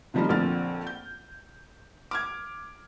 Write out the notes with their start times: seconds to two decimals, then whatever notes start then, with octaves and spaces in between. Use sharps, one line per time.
0.14 C3 D#3 F3 G3 A#3 A#4
0.29 A#1 F2 D3 F6 A6
0.87 G6
2.11 D6 F6 G#6